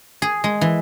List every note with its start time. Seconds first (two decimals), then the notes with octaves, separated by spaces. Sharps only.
0.22 G#4
0.44 G#3
0.61 E3